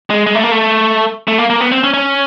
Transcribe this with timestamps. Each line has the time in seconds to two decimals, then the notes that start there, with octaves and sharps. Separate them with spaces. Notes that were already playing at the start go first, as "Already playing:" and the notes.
0.10 G#3
0.27 G#3
0.35 A3
0.43 A#3
0.51 A3
1.28 A3
1.38 A#3
1.50 A#3
1.61 B3
1.72 C4
1.84 C#4
1.94 C#4